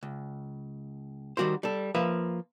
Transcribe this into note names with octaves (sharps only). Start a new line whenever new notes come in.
C#2
D#3 G3 F#4 A#4 C5
G3 A4
F3 A#3 B4 E5